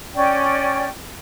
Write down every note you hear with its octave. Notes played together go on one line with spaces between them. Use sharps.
C#4 D5 G5